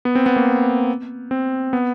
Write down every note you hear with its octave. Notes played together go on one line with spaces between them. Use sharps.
B3
C4
B3
A#3
C4
B3